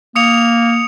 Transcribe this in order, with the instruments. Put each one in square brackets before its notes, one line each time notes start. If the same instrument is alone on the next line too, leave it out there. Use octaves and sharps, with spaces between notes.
[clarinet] A#3 [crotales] D#6 C#7 F7